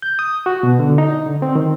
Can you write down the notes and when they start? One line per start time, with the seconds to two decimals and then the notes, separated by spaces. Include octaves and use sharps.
0.02 G6
0.19 D#6
0.46 F#4
0.63 B2
0.79 D3
0.98 D#4
1.26 D3
1.42 C4
1.55 D#3